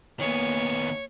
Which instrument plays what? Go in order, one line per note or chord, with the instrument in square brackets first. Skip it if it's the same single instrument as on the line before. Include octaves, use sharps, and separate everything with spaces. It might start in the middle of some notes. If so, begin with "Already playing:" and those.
[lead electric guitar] D#3 B3 [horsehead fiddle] A#3 G#5 [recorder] C#5